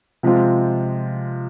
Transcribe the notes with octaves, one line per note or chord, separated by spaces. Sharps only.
C3 F3 G#3 C4 F4